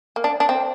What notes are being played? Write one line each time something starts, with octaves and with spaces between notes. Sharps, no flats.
A#3
D4
D4
C4